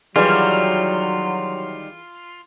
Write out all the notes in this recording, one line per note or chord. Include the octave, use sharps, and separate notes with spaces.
D#3 E3 F#3 G3 F4 G#4